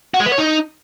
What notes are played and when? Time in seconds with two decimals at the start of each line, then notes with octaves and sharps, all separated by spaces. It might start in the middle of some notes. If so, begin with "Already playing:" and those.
0.14 F#4
0.20 G#3
0.26 B3
0.32 C#5
0.38 D#4